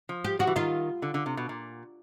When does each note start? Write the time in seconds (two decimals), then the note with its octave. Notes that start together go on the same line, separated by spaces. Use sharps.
0.09 F3
0.24 G4
0.39 F3 F#4
0.47 E3
0.56 D#3 F4
1.02 D3
1.14 D3
1.26 C3
1.37 B2
1.49 A#2